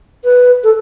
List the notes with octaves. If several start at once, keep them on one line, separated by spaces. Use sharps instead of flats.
B4
A4